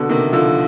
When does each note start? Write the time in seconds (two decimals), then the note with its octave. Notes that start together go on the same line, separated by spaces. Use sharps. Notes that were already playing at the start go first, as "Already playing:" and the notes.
Already playing: B2 D3
0.09 C3 D#3
0.32 D3 F3